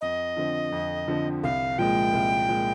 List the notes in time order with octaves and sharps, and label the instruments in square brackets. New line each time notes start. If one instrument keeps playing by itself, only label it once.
[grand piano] F2 [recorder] D#5
[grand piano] D3 F3 C4
F2
D3 F3 C4
[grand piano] C2 [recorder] F5
[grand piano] A#2 F3 G#3 [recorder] G5
[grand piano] C2
A#2 F3 G#3